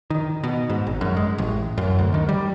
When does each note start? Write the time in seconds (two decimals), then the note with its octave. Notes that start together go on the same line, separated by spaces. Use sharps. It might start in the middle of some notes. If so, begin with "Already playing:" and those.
0.10 D#3
0.44 B2
0.70 G#2
0.87 G#1
1.01 F#2
1.17 G#3
1.38 A1
1.78 F#2
1.99 D2
2.14 D#3
2.29 G3